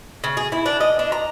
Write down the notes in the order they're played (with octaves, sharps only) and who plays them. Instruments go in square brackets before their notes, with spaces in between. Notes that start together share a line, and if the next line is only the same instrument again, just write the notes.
[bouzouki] C#3
G#4
E4
D4
D#5
D4
A#5